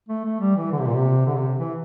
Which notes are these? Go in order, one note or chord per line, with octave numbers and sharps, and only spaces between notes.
A3
A3
G3
E3
D3
C3
A#2
C3
D3
C3
E3